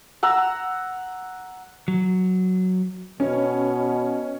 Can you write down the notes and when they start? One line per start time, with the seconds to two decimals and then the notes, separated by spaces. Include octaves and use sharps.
0.23 F#5 A#5 E6
1.88 F#3
3.20 B2 C#4